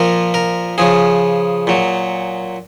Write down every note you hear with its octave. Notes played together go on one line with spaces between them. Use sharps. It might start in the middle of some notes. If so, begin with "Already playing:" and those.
Already playing: A#2 F3 A#4
A#4
C#3 F3 G#4
A#2 F#3